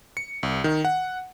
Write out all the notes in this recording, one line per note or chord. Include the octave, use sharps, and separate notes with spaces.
C#7
C2
D#3
F#5